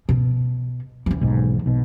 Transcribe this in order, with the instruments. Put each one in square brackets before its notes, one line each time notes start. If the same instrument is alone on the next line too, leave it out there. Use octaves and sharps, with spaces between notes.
[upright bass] B2
D#2 E3
[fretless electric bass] B1 G#2
B1 B2